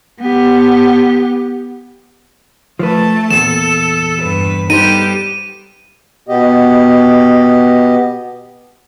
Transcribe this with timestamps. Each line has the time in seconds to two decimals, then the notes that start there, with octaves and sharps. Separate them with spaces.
0.21 B3 G4
2.79 F3 A3 B4 A5
3.31 E2 A#2 A4 E7
4.20 G2 B4
4.70 G3 B3 D#4 G4 A4 C5 D#7
6.29 B2 B3 G4 D#5